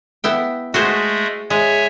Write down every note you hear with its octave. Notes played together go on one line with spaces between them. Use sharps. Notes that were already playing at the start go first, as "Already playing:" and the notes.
B3 E4 G5
G#3 A3 F#4 G#4 C5
G#3 C#5 E5 G#5